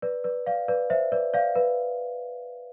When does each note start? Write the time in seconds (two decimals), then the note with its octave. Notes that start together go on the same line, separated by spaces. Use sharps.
0.02 B4 D5
0.24 B4 D5
0.46 D5 F5
0.68 B4 D5
0.90 C5 E5
1.12 B4 D5
1.34 D5 F5
1.55 B4